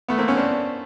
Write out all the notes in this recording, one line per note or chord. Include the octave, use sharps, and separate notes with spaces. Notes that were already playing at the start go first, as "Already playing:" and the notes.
A3 B3
A#3 C4
B3 C#4
C4 D4